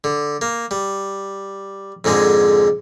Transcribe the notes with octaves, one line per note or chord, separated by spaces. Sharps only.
D3
A#3
G3
F2 G#2 D3 G#3